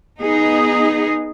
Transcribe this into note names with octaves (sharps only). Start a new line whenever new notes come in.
B3 D#4 G#4